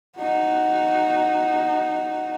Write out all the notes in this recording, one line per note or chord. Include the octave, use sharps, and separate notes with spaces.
D#4 F#4